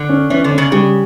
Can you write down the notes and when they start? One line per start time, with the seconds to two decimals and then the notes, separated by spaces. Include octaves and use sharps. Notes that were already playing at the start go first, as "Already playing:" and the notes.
Already playing: D3
0.09 C#4
0.30 E3 C#4
0.44 D3
0.51 C#4
0.58 C#3
0.72 C#3 G3